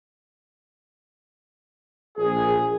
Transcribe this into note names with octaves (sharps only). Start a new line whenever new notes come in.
A#1 G#4